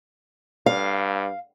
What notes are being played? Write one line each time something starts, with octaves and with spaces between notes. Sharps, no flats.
G2 F5